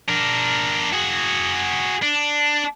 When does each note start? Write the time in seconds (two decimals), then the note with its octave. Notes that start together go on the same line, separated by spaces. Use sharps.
0.09 D4 A#4
0.93 F#4 G#4
2.02 D4